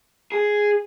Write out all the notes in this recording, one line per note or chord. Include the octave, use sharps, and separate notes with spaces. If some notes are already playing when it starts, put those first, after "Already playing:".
G#4